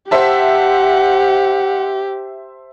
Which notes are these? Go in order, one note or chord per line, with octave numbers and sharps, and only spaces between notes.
G4 C5 E5 F#5 A5